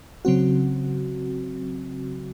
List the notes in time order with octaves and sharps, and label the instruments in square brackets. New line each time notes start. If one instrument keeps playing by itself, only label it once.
[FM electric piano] C#3 F#3 C4 F#4